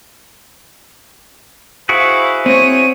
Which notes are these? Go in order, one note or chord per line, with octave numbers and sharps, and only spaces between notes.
E4 F#4 G#4 C5 F5
C4 C5 C#5 D#7